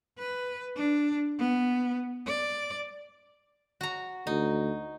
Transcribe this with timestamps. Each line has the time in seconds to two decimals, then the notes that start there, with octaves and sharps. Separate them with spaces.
0.18 B4
0.76 D4
1.39 B3
2.27 D5
3.81 F#4 A#5
4.27 D2 D#4